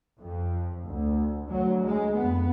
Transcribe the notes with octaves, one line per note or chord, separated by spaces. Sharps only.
F2
D2
D2 F#3
G#3
F2 B3